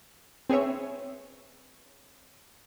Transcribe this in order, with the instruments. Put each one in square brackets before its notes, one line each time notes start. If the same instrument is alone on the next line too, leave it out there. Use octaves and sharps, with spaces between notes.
[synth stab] C4 G#4 B4 C#5 E5